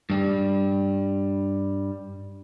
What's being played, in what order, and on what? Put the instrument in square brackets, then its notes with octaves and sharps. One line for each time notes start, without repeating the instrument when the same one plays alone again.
[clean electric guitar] G2 G3